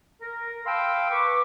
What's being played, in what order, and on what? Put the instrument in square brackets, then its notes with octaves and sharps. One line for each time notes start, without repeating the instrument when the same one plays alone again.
[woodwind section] A#4
F5 G5 A5 B5 C6 E6
B4 C#6 D6